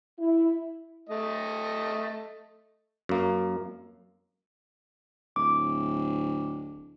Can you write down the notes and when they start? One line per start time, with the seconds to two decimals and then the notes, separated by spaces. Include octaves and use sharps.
0.19 E4
1.09 A3 D#5
3.09 F#2 A#3
5.36 D1 D6